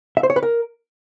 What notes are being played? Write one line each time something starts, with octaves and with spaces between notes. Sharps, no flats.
E5
C5
C#5
B4
A#4